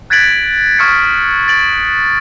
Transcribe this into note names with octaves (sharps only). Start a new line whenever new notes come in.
F#6 G#6 A6 B6 D7 F#7
C#6 D#6 F6 G#6 C#7
A6 D7 F#7